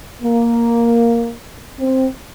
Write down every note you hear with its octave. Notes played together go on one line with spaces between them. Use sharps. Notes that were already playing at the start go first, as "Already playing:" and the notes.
A#3
C4